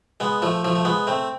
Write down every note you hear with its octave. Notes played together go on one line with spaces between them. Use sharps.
G#3 B3
F3 A3
F3 A3
A3
G#3 B3
A3 C4